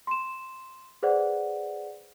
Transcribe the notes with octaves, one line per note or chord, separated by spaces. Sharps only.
C6 E7
G#4 B4 C5 D5 F#5